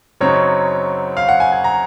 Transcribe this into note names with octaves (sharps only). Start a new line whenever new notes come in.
F#2 C#3 F#3 C4 D#4 C#5
F5
F#5
G#5
G#5
A#5